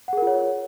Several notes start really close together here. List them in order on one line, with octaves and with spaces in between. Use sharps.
F#5 G#4 A#4 F4 C#5